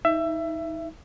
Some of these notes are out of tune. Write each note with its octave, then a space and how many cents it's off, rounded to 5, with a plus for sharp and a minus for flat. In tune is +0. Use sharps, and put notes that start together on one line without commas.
D#4 +30 E5 +20